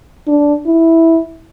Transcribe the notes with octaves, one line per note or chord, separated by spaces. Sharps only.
D4
E4